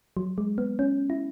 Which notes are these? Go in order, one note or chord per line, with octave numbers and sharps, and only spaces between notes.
F#3
G#3
B3
C#4
E4